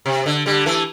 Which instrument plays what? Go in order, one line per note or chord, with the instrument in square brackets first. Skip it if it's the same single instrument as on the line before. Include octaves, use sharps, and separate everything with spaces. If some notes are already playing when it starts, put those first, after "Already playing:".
[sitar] C3
D3
D3 G3
E3 A3